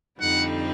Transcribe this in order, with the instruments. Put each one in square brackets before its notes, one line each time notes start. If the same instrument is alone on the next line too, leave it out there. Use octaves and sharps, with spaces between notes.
[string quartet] F2 D3 G3 C4 D#4 [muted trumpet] F#5